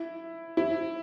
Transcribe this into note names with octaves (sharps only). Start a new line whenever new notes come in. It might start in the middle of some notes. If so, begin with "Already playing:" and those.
Already playing: E4
E4